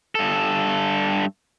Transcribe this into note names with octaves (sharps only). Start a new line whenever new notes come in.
G2 A4